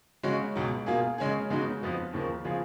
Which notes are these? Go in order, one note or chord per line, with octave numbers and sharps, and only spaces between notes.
C#3 G#3 C#4 F#4
C#2 B2 F#3
B2 A#3 F4 G#4
C#3 G#3 C#4 G#4
C#3 G#3 B3 D#4 F#4
F2 F3 B3 F#4
D#2 C#3 F3 A#3
C#3 F3 B3 F4 G#4